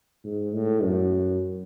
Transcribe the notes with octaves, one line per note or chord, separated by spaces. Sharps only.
G#2
A2
F#2